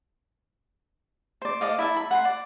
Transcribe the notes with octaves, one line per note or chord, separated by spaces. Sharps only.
C5 D5
A4 D5 D#5 F5
E4 E5 A5
B5
F#5 G#5 C6
D5